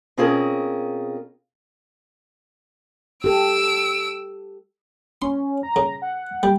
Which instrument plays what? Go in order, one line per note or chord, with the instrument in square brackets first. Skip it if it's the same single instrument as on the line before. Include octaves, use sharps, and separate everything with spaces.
[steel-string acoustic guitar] B2 C4 C#4 F4 G#4 A#4
[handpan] G4 A4 [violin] E6 D7
[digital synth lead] C#4 [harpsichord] C6
[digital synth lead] A#5
[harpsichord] C#3
[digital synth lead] F#5
[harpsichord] G3 [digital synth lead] G5